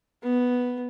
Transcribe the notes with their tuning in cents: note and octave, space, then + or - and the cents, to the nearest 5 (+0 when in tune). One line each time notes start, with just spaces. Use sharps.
B3 +0